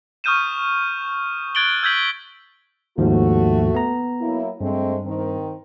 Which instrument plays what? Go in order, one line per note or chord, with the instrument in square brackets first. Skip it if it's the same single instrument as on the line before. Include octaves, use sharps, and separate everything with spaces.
[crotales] C#6 D#6 F6 G6 D#7 E7
F#6 G#6 A6 D7 F#7 G7
E6 G6 G#6 B6 F#7
[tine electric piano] D#2 G#2 F3 [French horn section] A3 F#4
[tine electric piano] B3 A#5
[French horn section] F#3 A#3 E4
[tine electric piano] G2 [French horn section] G#3 A3 C4
[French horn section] D#3 C4